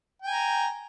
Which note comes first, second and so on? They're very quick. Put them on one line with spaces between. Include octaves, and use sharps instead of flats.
G5 G#5 A#5